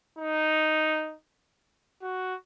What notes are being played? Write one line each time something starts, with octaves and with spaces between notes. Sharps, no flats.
D#4
F#4